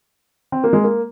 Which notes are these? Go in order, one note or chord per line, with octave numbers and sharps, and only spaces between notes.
C4
A#3
G#3
A#3